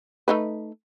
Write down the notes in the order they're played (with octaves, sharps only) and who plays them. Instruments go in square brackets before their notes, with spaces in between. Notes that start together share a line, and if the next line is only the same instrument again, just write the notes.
[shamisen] A3 D#4 B4